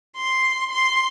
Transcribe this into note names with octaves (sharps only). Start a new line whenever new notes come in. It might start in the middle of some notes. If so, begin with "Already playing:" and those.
C6
C6